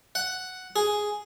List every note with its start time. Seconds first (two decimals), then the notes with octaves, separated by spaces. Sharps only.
0.15 F#5
0.76 G#4